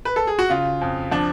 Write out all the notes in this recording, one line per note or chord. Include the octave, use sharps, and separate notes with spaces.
B4
A4
G#4
F#4
C#3 F4
F2
F3 D4